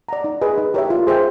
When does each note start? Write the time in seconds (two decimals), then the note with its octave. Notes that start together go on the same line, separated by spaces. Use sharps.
0.09 D5 F#5 A#5
0.24 D#4
0.41 G#4 B4 D#5 G#5
0.58 D#4
0.74 G4 A#4 C#5 E5
0.90 F4
1.07 G#4 C5 E5 G5